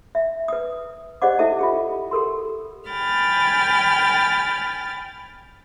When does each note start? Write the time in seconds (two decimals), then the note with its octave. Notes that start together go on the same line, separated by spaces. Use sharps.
0.15 E5
0.48 B4 D#6
1.22 G4 C5 D5 D#5 F#5 D6
1.39 E4 A4 E5 A5
1.59 F4 G4 G5
2.11 G4 A4 A#4 C6
2.88 G5 G#5 B5 F6 A6